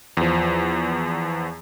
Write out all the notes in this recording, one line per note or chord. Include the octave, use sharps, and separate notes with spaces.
E2 F3